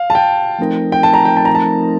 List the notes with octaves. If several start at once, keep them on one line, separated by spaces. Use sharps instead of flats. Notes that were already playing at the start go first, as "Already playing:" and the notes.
Already playing: F5
A5
G5
F3 A3 C4 D#4 A#4
G5
A5
A#5
G5
A5
A#5
A5